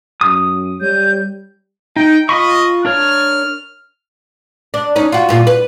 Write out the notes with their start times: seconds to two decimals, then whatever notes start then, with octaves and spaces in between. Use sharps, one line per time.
0.21 F#2 D#6
0.81 G3 C#5 G6
1.96 D#4 G5
2.29 F4 D#5 B5 C#6
2.85 D4 A#4 C#5 F6
4.74 D4
4.96 C#4 D#4
5.12 F4 F#4
5.29 G2 A#2 F4
5.47 B4